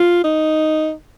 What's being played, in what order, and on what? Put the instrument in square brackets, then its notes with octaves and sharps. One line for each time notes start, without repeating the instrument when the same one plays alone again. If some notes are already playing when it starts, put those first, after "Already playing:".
Already playing: [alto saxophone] F4
D#4